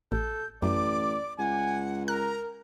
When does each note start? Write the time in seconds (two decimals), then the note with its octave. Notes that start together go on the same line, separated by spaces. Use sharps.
0.12 A1 A4 G6
0.62 A1 F#2 D5 D6
1.39 C#2 F#5 G#5
2.08 A#4 A#5 F#6